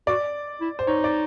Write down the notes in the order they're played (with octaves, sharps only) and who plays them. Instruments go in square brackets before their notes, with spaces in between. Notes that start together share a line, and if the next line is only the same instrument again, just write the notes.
[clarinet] F#4 [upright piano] D5
[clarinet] E4
[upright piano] C5
[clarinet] D#4 [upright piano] C#5
[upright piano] D5